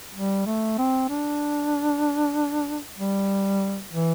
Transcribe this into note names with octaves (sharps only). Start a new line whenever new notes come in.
G3
A3
C4
D4
G3
E3